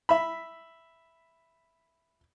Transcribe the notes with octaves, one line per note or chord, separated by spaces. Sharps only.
E5 B5